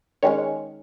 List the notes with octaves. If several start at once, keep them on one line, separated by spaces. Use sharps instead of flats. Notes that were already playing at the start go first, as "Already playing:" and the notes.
D#3 G#3 C#4 C#5